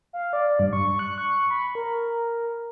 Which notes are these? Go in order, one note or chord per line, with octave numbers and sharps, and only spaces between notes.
F5
D5
G2
C#6
F#6
C#6
B5
A#4